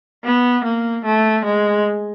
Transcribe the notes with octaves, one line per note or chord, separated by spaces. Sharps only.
B3
A#3
A3
G#3